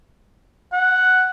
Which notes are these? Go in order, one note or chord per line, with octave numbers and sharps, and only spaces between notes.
F#5